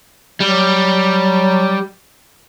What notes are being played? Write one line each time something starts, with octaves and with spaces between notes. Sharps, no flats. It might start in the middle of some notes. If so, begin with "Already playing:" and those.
F#3 G3